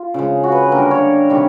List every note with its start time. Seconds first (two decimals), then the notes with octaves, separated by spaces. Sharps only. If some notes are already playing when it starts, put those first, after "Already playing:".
Already playing: F4
0.14 C#3 F3 G#3
0.43 F#4
0.52 B4
0.63 B4
0.72 D3 G3 A#3 A#4
0.82 A#4
0.91 C#5
1.30 C3 D#3 G3